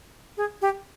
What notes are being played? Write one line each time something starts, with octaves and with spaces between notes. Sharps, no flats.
G#4
G4